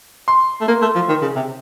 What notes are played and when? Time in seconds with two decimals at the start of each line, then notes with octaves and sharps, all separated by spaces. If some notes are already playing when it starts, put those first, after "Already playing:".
0.28 C6
0.61 A3
0.68 A#3
0.82 A3
0.95 F3
1.08 D#3
1.22 C#3
1.35 C3